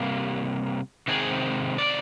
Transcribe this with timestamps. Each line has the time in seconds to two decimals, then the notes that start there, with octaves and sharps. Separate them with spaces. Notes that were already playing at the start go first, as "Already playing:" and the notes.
Already playing: C3 G3 A#3
1.08 C3 D#3 G#3 C4 G#4
1.78 D5